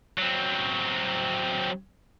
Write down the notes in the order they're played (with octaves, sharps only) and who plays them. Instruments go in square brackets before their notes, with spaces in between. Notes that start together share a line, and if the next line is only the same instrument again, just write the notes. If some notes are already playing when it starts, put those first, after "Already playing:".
[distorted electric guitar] F#3 C4